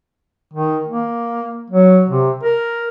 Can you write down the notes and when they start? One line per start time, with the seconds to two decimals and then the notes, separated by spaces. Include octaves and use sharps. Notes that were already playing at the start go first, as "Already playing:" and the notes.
0.54 D#3
0.88 A#3
1.70 F#3
2.09 C3
2.43 A#4